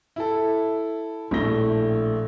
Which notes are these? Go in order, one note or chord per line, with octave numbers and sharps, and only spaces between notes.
E4 A4
A#1 A2 A3 E4 A#6 G7